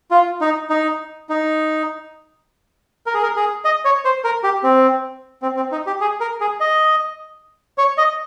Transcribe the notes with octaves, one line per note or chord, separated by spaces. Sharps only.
F4
D#4
D#4
D#4
A#4
G#4
A#4
G#4
D#5
C#5
C5
A#4
G4
C4
C4
C4
D#4
G4
G#4
A#4
G#4
D#5
C#5
D#5